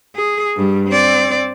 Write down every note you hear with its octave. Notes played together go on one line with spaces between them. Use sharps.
G#4
G2 G3
C4 D5